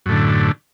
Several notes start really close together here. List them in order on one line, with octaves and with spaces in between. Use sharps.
F#2 A2 D3